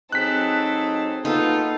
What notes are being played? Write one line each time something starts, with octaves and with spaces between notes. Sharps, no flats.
F#3 C4 D#4 G#4 A4 F#6 B6
A#3 B3 D#4 F4 A4